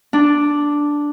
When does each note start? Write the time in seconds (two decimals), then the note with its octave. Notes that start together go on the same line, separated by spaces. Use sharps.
0.13 D4